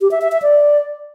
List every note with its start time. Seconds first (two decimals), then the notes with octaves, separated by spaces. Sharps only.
0.01 G4
0.11 E5
0.22 E5
0.32 E5
0.42 D5